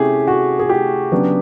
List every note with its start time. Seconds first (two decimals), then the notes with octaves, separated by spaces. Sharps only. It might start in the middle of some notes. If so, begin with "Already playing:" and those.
Already playing: C3 A3 C#4 E4 G4 G#4
0.28 F#4
0.60 G#4
0.70 G4
1.12 C#3 F#3 B3 D4